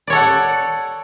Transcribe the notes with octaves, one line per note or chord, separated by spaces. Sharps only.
A4 C#5 D5 F#5